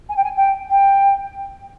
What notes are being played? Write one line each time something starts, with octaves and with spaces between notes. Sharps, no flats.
G#5
G5
G#5
G5
G5